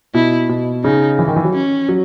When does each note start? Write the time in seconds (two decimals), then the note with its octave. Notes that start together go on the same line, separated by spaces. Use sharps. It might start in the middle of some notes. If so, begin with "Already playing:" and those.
0.14 B2 E4
0.49 B2
0.84 C#3 D#4
1.19 E3
1.28 D#3
1.36 E3
1.45 F#3
1.54 C#4
1.89 F#3